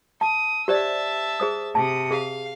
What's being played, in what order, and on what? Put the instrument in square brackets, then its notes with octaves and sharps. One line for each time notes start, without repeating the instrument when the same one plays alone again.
[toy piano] A5 [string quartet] D#6
[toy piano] G4 C5 D5 [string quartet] E5 A5 E6
[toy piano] G#4 C5 D#6
[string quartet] C3 D#6 [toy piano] A5
[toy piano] G#4 [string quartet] F5